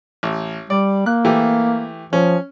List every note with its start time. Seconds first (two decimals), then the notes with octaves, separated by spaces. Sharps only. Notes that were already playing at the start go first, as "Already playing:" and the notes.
0.23 A1
0.70 G3 D5
1.06 A#3 F#6
1.25 E3 A3 G4
2.13 F3 C#4